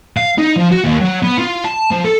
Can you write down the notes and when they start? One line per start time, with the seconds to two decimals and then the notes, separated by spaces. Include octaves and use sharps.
0.17 F5
0.38 D#4
0.56 F3
0.71 F#4
0.84 D#2
1.00 F#3
1.23 B3
1.38 F4
1.64 A5
1.91 F3
2.04 A4